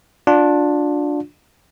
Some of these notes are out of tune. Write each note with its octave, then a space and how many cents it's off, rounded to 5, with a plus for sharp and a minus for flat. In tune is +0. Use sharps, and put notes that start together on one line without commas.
D4 +0 F4 +35